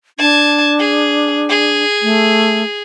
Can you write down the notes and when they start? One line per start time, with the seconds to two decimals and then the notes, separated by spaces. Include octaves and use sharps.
0.19 D4 A5 G#6
0.80 G#4
1.50 G#4
2.02 A3